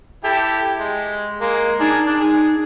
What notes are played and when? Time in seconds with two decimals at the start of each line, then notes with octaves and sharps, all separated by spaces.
0.24 E4 G4 A4
0.79 G#3
1.41 G#3 A#3
1.80 D4 D#4 G#4 A#4
2.07 D4
2.20 G#4